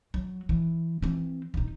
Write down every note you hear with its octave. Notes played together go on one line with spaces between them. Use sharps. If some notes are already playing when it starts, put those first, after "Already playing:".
F#3
E3
E3 C4
D#1 D#4